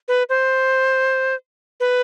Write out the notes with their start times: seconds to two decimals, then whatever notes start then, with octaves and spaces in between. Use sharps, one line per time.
0.08 B4
0.29 C5
1.80 B4